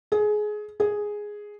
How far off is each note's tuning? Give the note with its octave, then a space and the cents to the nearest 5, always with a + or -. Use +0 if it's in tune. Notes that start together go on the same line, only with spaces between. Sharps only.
G#4 +20
G#4 +0